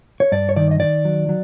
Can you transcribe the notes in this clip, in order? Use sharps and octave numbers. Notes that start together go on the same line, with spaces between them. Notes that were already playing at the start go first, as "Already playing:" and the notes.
C#5
G2 D5
C#5
D#3 D5
D#5
D#3 D5
F#3
F#3